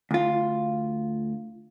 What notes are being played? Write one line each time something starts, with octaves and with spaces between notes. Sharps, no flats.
D2 F4